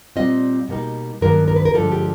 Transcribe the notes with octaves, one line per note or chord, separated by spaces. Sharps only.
A#2 G3 C4 F4 D#5
B2 G3 A#3 D#4
G2 D#3 F#3 A#3 A#4
A#4
B4
A#4
G2 D3 F3 G#3 A4
G4